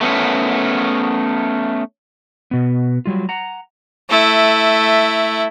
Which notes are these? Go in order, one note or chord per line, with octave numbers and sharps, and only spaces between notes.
A3 B3 C#4
B2 B3
F#3 G3 F4
F#5 A#5
A3 E4